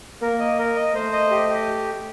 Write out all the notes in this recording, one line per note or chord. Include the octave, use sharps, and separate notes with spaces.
A#3 A#4
D#5
A#4
D#5
A3 C5
D#5
G4
G4